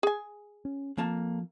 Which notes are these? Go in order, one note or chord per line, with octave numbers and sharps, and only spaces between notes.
G#4 G#5
C#4
F2 F3 A#3 A5